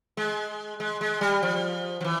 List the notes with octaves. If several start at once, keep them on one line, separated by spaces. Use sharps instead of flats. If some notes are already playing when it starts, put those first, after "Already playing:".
G#3
G#3
G#3
G3
F3
F3
E3